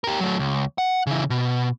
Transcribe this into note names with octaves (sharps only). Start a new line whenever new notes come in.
G4 A#4
F#3 A3
C#2
F#5
C#3 E3
B2